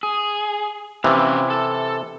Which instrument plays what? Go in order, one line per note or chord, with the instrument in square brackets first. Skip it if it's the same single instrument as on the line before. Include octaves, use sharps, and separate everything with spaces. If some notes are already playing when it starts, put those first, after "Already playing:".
[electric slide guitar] G#4
[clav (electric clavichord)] C3 E3 [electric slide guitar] C#4 E4 F5
[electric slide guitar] A4